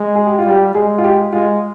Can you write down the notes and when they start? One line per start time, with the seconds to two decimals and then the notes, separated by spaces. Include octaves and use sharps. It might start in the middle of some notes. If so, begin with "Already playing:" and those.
Already playing: G#3
0.15 G#4
0.27 G4
0.39 F4
0.45 G3
0.50 G4
0.75 G#3 G#4
0.98 F4
1.04 G4
1.33 G#3 F4